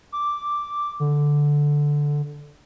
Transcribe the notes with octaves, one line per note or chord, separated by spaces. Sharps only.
D6
D3